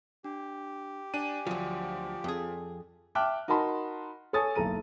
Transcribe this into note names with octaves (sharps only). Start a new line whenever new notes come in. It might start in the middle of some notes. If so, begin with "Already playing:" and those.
D4 G4
D4 D5 G#5 D#7
D2 F3 F#3
F2 G#4
E5 G5 A5 D6 F6 F#6
D#4 F#4 A#4 A5 B5 C6
A4 C#5 G#5 A5 D#6 A6
F#1 B1 A4 A#5 D#7